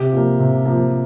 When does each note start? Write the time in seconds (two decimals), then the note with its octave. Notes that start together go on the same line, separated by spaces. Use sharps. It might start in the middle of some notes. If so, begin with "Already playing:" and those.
Already playing: C3 G4
0.13 F3 A#3
0.39 C3
0.65 F3 A#3